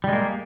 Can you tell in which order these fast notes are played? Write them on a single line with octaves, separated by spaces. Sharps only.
G3 G#3 A#3